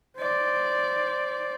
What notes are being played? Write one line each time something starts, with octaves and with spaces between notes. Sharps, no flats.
C5 D5